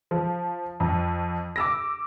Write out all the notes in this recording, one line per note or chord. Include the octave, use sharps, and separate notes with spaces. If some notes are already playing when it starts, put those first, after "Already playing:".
F3
F2
D6 E6 A#6